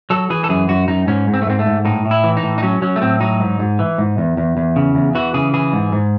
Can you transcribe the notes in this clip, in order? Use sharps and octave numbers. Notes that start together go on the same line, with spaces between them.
F#3 A4
E3 G#4
A4
F#2 G#4
F#2 F#4
F#2 D#4
G#2 C#4
G#2
C4
A3
G#2 C4
A3
G#2
A2 D#4
A2
E4
E3
D#4
A2
D#4
F#3 C#4
F#3 C#4
A3
A2 C4
F#3 D#4
G#2
G#2
E3
G#2
E2
E2
E2
C#3
E2
E3 F#4
C#3 G#4
E3 G#4
G#2
G#2